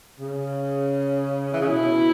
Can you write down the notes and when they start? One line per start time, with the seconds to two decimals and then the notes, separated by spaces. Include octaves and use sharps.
0.19 C#3
1.52 E3
1.61 C#3
1.68 B2 E4